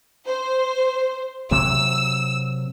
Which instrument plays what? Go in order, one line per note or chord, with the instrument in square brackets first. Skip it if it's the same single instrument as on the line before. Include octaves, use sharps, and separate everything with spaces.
[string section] C5
[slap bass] C3 F#3 A#3 [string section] E6